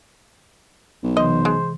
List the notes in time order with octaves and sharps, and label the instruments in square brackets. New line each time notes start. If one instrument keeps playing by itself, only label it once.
[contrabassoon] B1
[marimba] C3 E3 [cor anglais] C5 [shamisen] D#5
[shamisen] G#3